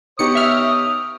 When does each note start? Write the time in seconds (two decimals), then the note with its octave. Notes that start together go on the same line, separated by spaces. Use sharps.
0.19 B3 D#4 G4 C#5 D#6 C#7
0.35 E5 F6